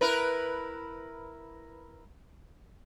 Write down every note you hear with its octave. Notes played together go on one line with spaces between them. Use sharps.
E4 A#4 B4